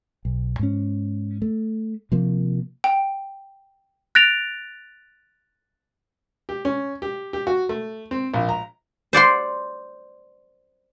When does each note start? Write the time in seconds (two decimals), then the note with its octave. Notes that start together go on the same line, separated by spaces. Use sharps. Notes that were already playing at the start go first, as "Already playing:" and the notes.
0.25 B1
0.59 G#2 C#4
1.42 A3
2.12 C3 F3 A#3
2.84 G5
4.15 F#6 A6 A#6 D7 F7
6.49 G4
6.65 C#4
7.02 G4
7.33 G4
7.47 F#4
7.69 A3
8.11 C4
8.34 A#1
8.49 A#5
9.13 C5 D5 F#5 C6